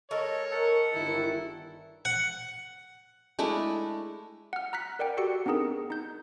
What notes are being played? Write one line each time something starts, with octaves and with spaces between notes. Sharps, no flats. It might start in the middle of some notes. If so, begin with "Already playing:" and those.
G#3 A4 A#4 C#5
A4 A#4 F#5
G1 D#3 E4
F#5
G#3 A3 D4 E4
F#5 F6
A#5 F6 F#6 B6
A#4 D5 F#5 G5
F#4 G4 A4 D5 C#7
B3 C4 D4 D#4 G#4 A#4
D#4 G6